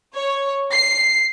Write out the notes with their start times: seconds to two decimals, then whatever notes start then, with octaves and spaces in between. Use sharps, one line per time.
0.14 C#5
0.72 C7